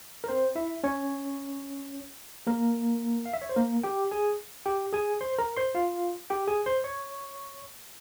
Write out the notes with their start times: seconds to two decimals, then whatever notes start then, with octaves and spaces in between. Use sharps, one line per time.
0.24 A#4
0.28 C4 C5
0.55 E4 E5
0.84 C#4 C#5
2.47 A#3 A#4
3.26 F5
3.33 E5
3.42 C#5
3.49 C5
3.56 A#3 A#4
3.83 G4 G5
4.11 G#4 G#5
4.66 G4 G5
4.93 G#4 G#5
5.21 C5 C6
5.38 A#4 A#5
5.57 C5 C6
5.75 F4 F5
6.30 G4 G5
6.48 G#4 G#5
6.66 C5 C6
6.84 C#5 C#6